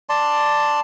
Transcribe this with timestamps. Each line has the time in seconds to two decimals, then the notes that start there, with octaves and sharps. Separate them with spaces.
0.09 D5 A5 C6